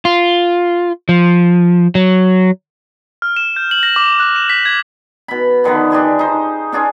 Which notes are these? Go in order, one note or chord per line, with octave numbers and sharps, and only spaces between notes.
F4
F3
F#3
F6
E7
G6
F#7
A#6
D6
F#6
E7
B6
G#6
B2 B5
D3 D#3 F3 B3
D4 G4 G#4 C6
D#4 C5
C#4 D4 F4 G#4